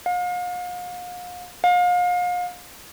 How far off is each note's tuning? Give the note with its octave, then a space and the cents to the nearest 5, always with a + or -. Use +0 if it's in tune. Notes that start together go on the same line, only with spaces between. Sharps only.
F5 +40
F5 +35